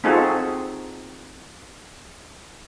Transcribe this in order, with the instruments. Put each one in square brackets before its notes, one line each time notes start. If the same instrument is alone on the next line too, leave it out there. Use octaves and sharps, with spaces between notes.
[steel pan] C4 D#4 F4 F#4 G#4 A4